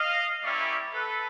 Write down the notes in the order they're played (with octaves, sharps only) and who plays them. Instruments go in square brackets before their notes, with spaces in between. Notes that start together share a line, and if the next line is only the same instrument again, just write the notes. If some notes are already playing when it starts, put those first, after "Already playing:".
Already playing: [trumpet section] D#5 F5
G3 A#3 C#4 E4 G4 D5 E5
A4 B4